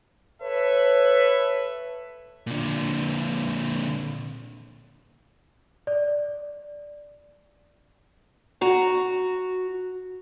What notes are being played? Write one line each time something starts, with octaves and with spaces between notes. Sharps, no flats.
A4 B4 C#5 E5
A#2 D3
D5
F#4 A#5